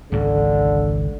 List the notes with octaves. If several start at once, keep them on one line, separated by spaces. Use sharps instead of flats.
G#1 C#2 G#2 D3